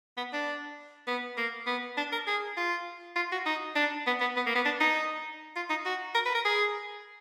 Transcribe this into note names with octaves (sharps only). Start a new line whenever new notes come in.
B3
D4
B3
A#3
B3
D4
A#4
G#4
F4
F4
F#4
D#4
D4
B3
B3
B3
A#3
B3
D4
D#4
F4
D#4
F#4
A#4
B4
A#4
G#4